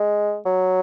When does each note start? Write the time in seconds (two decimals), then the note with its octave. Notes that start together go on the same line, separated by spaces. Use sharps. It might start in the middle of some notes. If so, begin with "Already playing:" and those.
Already playing: G#3
0.46 F#3